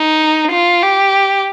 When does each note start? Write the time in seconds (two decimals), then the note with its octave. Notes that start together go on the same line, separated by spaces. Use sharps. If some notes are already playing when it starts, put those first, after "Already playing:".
Already playing: D#4
0.51 F4
0.83 G4